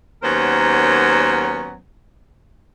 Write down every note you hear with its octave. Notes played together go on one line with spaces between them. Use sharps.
D#2 F#3 B3 C#4 A#4 C5